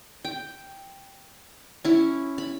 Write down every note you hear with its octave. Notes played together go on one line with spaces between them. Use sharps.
G5
C#4 E4
B5